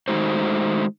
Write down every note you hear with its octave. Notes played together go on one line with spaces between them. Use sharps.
D#3 G#3 A3 D#4 F#4 C5